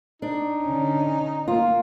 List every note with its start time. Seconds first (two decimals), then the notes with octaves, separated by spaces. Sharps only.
0.22 D4 D#4
0.64 D3 C#4
1.48 A#3 F4